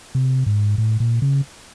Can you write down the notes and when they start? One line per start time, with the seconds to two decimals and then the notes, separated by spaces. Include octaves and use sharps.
0.15 C3
0.46 G#2
0.78 A2
1.00 A#2
1.22 C#3